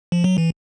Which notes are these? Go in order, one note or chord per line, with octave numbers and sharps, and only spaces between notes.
F3
F#3
E3